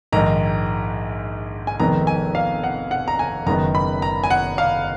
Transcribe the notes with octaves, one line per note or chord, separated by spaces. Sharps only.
A#1 G#2 D#3 G#3 A#5
G#5
F1 F2 D#3 G#3 B3 A#5
G#5
F5
F#5
F#5
A#5
G#5
F#1 F#2 D#3 G#3 B3 A#5
B5
A#5
G#5
F#5
F5